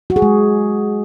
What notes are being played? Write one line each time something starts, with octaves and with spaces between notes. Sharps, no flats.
F#4
G#4
G#3